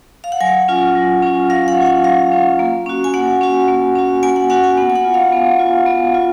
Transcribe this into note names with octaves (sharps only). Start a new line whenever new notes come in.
F5
F#5
F#3 G#5
C#4 F4
F#3
C#4 F4
F#3 F5
F#5
C#4 F4
F#5
F#3 F5
C#4 F4
A#3
C#4 F#4
G#5
A#3 F#5
C#4 F#4
A#3
C#4 F#4
A#3 G#5
F#5
C#4 F#4 F#5
G#5
B3 F#5
G#5
F#5
F4
F5
B3
F4
B3
F4